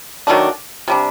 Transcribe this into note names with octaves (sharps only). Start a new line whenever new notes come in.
D#3 F#3 A3 D4
C3 G3 D4